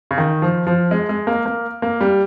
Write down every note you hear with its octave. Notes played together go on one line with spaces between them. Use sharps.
C#3
D#3
F3
F3
G#3
G#3
A#3
A#3
A#3
G3